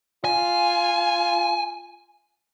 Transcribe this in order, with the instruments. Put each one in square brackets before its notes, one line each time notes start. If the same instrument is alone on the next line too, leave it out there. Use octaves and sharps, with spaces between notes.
[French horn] F4 [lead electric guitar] G#5